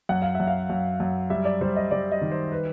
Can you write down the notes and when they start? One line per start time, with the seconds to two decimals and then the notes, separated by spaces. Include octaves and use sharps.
0.09 F#2 F#5
0.22 F5
0.35 F#2 E5
0.48 F5
0.70 F#2
1.00 F#2
1.30 G3 E5
1.45 D5
1.61 G3 C5
1.76 D#5
1.91 G3 D5
2.12 D#5
2.21 D#3
2.32 C5
2.52 B4